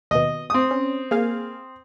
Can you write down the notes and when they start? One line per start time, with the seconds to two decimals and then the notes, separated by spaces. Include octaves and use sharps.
0.11 D#2 B2 D#5
0.50 C4 D#6
0.71 C#4
1.11 A#3 G#4 F5